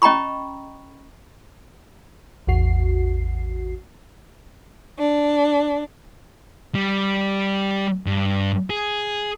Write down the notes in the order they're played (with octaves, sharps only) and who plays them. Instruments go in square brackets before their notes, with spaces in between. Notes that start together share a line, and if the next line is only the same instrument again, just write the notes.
[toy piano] C#4 D#5 G5 A#5 B5 C#6
[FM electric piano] A1 E2 F#4 C7
[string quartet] D4
[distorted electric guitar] G3
G2
G#4